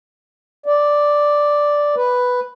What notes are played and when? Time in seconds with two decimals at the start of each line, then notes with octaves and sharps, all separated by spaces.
0.66 D5
1.96 B4